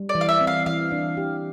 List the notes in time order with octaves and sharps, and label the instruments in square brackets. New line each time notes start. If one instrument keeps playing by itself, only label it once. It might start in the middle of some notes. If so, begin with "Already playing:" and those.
Already playing: [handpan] G3
[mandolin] D5
[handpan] E3
[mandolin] F5
E5
[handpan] C4
[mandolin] F5
[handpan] E3 [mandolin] F5
[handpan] D4
G4